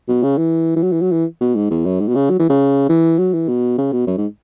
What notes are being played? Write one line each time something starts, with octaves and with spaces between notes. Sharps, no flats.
B2
C#3
E3
E3
F#3
E3
F#3
E3
B2
G#2
E2
F#2
G#2
B2
C#3
F#3
E3
C#3
E3
F#3
E3
B2
C#3
B2
F#2
G#2